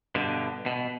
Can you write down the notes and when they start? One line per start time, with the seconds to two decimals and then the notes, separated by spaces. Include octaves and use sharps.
0.15 G2 B2 D3
0.66 B2